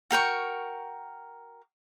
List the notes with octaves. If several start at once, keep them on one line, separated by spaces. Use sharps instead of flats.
F#4 A#4 G5 C#6